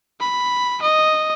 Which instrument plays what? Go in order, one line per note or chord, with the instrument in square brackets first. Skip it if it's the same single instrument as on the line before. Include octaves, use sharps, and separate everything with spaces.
[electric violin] B5
D#5